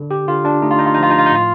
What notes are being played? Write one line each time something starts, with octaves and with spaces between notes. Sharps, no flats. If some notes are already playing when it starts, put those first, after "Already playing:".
Already playing: D3
G4
D3 F4
D4
A3 D#4
F4
D#4
F4
F3 D#4
F4
D#4
F4
D#4
A2 F4